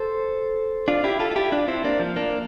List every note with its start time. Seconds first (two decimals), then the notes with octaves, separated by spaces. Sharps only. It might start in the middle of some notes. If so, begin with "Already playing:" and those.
Already playing: A4 C5
0.88 D4 F4
1.04 E4 G4
1.19 F4 A4
1.31 F4
1.36 E4 G4
1.52 D4 F4
1.68 C4 E4
1.84 A#3 D4
2.00 F3
2.16 A#3 D4